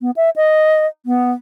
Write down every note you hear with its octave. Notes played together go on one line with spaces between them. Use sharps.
B3
E5
D#5
B3